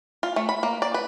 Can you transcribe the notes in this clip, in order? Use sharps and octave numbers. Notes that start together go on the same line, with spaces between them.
F4
A3
B5
A#3
D5
B4